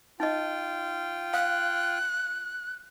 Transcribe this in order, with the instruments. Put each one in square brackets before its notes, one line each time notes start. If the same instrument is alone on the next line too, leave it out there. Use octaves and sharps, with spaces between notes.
[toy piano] D#4 D#5 [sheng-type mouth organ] F4 G5
[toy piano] F5 [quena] F#6